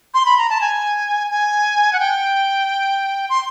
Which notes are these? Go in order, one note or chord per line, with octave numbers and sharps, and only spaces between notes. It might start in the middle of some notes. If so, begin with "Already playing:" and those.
C6
B5
A#5
A5
G#5
G#5
F#5
G5
C6